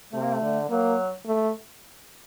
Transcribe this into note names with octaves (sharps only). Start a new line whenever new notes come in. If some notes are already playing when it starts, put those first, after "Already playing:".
C3 A3
A#3
A3
D3
F#3 A#3
A3